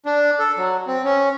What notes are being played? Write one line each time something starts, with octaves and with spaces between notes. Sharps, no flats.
D4
A4
F#3
C4
C#4